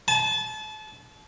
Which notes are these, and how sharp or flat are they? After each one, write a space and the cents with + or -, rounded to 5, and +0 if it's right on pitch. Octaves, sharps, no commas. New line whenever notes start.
A5 -30